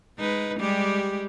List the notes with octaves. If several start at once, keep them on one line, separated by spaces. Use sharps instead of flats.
G#3 D#4 B4
G3 G#3 G4